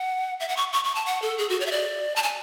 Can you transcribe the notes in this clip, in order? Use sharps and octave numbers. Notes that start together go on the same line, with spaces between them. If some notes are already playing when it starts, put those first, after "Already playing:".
Already playing: F#5
E5
F#5
C#6
C#6
C#6
A5
F#5
A4
G#4
F#4
C#5
E5
D5
A5
G#5